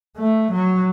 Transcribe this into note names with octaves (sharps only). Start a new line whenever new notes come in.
A3
F#3